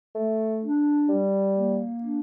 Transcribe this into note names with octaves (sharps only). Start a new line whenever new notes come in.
A3
D4
G3
A#3
D4